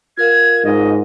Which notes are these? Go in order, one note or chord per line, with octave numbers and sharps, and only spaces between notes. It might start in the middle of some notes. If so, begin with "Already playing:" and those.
F4 A#4 F5 G#6
G#2 D#5